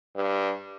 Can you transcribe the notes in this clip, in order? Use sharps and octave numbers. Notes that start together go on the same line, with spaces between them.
G2